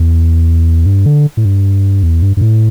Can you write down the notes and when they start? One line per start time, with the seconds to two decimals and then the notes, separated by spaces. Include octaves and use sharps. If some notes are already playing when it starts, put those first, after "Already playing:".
Already playing: E2
0.86 G2
1.06 D3
1.37 A2
1.45 G2
2.03 E2
2.22 G2
2.37 G2
2.41 A2